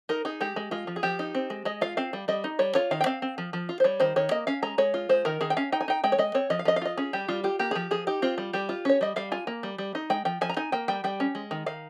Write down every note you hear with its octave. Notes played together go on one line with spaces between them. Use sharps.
D#4 A#4
D#4 G#4
G#3 G4
G#3
G#3 F4
F3
G#4
F3 G4
D#4
C4
G#3
G#3 D#5
F4 F5
C4 F5
G3
G3 D#5
D#4
G3 C#5
F4 C#5
D#3 F5
G5
C4 F5
C4
F3
F3
F4
C5
G3 C#5
D#3 C5
D#3 C#5
A#3 D#5
C#4 F5
G#3 A#5
G#3 C#5
F4
G#3 C5
D#3 A#4
D#3 G#4
G5
C#4 F5
D#4 G5
G#5
D#4 G5
G#3 G5
C#5
G#3 D#5
C4 C#5
F3 D#5
F5
F3 D#5
F5
F4 D#5
C#4 G#4
G3 G4
G3 F4
F4 G4
A#3 G4
G#4
F3 G4
F3 G#4
D#4 G4
C4 F4
G3
G3 G4
F4
C#4 C#5
G3 D#5
G3 F5
F4 G#5
A#3
G3
G3
D#4
G#3 G5
F3 G5
F3 G#5
A#5
D#4 G#5
A#3 G5
G3 G5
G3 G5
C#4
G#3
D#3
D#3 F5